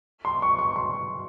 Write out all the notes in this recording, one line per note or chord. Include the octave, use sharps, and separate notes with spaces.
C6
C#6
C#6
C6